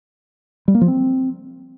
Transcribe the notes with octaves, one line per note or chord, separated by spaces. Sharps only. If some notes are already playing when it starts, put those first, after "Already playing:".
G3
A#3
F3
C4